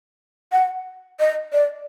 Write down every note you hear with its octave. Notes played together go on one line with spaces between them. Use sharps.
F#5
D#5
D5